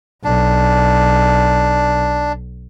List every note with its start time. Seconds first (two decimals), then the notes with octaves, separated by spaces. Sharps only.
0.24 B1 D4